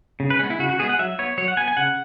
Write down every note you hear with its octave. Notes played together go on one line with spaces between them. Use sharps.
C#3
B4
G#3 B3 C#4
E4
C#3 F#4
F#4
G#3 B3 G#4
F#5
F#3 E5
B3 C#5
F#3 C#5
F#5
B3 G#5
G#5
C#3 F#5